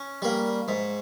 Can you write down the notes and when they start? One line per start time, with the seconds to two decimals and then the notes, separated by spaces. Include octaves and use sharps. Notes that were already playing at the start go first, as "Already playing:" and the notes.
Already playing: C#4
0.22 G3 A#3
0.68 G#2